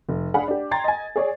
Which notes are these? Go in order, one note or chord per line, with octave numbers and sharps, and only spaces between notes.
F1
D4 G#4 F5 F#5 G#5 B5
D4 G4
G5 A#5 C6 G#6 A6
D#5 G#5
G#4 C#5 D5